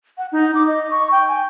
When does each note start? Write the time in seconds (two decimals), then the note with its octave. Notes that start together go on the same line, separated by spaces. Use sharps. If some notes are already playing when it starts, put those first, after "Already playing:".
0.18 F#5
0.32 D#4
0.55 D6
0.67 D#5
0.91 C#6
1.12 G5
1.29 G#5